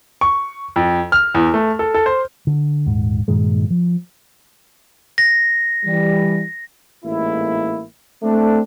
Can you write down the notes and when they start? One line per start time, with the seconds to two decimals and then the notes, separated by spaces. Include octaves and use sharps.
0.21 C#6
0.76 F2
1.12 F6
1.34 E2
1.54 A3
1.79 A4
1.94 A4
2.06 C5
2.47 D3
2.86 D#1 G#2
3.28 G2 A#2 D#3 G#3
3.70 F3
5.18 A#6
5.85 E3 G3
7.04 A1 G#2 A#3 E4
8.22 A3 C4 D4